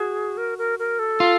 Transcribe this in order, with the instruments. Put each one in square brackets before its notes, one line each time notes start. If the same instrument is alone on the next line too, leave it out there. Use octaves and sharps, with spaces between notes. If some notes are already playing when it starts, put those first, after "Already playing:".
Already playing: [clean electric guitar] F#4 [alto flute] G#4
[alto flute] A#4
A#4
A#4
A4
[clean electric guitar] F4